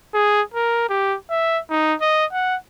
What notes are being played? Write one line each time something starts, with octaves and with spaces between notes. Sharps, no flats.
G#4
A#4
G4
E5
D#4
D#5
F#5